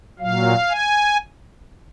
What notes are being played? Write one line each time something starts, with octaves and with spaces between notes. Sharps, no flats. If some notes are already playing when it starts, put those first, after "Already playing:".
A#2 F#3 F5
G#5